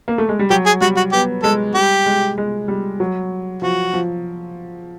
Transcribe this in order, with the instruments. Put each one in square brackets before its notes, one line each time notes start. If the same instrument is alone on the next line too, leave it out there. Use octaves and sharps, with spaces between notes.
[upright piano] A#3
A3
G#3
G3
[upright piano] F#3 [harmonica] G4
[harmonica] G#4
[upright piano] G3 [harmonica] F#4
[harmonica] F#4
[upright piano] B3 [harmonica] G4
[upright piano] G#3 [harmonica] A4
[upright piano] G3 [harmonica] G4
[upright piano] G#3
G#3
G3
F#3
[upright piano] F3 [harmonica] F#4
[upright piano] F3